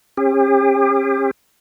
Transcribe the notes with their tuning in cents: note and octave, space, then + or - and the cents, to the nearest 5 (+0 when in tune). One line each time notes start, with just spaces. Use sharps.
C#4 -40 G4 +40